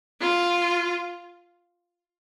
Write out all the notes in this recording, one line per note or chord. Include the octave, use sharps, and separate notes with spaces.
F4